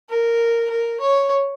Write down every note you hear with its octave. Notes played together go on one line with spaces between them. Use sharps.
A#4
A#4
C#5